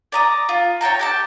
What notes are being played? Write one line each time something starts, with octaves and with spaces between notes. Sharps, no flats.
D5 A#5 D#6
F4
C#5 G5 A5 A#5
G4 G5 A5